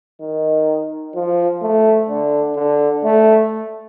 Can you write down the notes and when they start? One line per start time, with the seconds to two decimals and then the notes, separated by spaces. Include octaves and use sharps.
0.21 D#3
1.15 F3
1.62 A3
2.09 D3
2.56 D3
3.04 A3